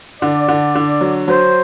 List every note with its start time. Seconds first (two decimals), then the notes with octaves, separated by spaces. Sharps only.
0.22 D3 D5
0.48 D3
0.75 D3
1.01 F#3
1.28 F#3 C5